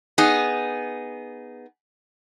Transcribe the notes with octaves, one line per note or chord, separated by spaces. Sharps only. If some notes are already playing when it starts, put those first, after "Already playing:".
B3 D#4 G#4